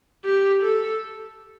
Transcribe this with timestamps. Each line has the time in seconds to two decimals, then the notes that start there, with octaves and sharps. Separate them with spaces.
0.25 G4
0.63 A4